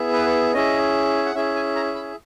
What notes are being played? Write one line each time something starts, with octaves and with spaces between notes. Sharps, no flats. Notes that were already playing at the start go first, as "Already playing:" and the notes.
Already playing: B3 E4 G#4
B4
C#4 E4 G#4 D#5
F#5
C#4 E4 G#4 E5
G#5
A#5
B5